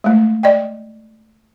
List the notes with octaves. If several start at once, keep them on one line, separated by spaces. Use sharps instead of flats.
G#3 A3
D5 D#5 G5